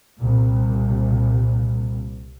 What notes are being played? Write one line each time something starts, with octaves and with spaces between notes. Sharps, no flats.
C2 A#2